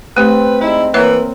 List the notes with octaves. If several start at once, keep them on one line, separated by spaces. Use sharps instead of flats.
A3 C4 G4 B4
G3 G#3 D#4 E4
E3 A#3 A#4 C#5 E5